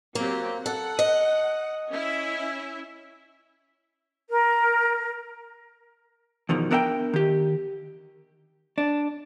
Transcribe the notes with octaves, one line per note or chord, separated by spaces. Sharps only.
F#3 A#3 C4 G4
A4 F#5
D#5
C#4 E4 E5
A#4
E2 B2 D#3 F3
B3 D4 A#4 E5 F#5 G5
D#3 G4
D4